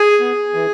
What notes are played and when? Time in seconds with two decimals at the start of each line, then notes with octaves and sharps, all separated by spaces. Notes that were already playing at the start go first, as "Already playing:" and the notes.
Already playing: G#4 G#5
0.20 B3
0.54 E3